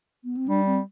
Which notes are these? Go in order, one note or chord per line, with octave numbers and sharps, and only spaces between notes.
B3
C4
G3 D4
C4